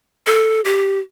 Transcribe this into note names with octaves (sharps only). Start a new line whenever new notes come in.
A4
G4